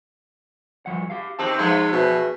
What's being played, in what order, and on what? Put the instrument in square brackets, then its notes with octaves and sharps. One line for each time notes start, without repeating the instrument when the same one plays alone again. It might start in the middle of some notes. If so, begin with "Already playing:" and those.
[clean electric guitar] G2 F3 F#5
G4 F5
[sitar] D#3 C4 G4 [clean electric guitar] A5
[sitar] F3 A3 B3 [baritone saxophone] G#3 [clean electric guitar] D#4
[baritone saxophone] B2 [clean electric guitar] G#4 B4 E5